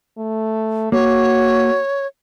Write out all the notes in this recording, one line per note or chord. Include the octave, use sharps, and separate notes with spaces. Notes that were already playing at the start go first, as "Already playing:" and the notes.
A3
A#3 F#4 C#5